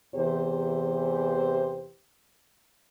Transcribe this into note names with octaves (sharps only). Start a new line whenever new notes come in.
E2 C3 E3 G4 C5